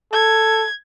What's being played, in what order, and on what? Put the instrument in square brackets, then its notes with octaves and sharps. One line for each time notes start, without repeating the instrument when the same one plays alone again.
[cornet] A4 [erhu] G#6